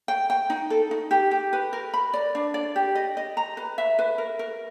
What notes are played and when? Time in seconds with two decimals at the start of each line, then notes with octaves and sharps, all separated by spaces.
0.08 G5
0.30 G5
0.50 D#4
0.70 A4
0.91 D#4
1.11 G4
1.31 G4
1.53 B4
1.73 A#4
1.94 B5
2.14 D5
2.35 D4
2.54 D5
2.76 G4
2.95 D#5
3.17 D#5
3.37 A#5
3.57 B4
3.78 E5
3.99 B4
4.18 A#4
4.39 A#4